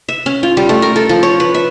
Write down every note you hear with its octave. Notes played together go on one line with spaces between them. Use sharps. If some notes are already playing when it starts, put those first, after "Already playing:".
E5
C#4
F4
G3
A3
A#4
A4
F3
C#5
B4
E5